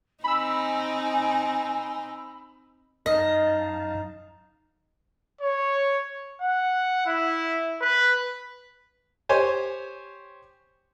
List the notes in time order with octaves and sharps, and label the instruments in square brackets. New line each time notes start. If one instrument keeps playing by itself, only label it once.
[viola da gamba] C4 D#4 [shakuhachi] G#5 [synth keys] B5 E6
[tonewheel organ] F#2 F5 A5 [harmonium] D#4 [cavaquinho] D#5
[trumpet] C#5
F#5
E4
B4
[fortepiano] G4 C5 C#5 G#5